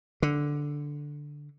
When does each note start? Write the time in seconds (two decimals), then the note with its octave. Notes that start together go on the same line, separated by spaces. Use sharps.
0.22 D3